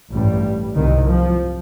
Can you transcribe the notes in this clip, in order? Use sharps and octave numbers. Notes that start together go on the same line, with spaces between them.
A1 G2 G3
C2 C3 D#3
F3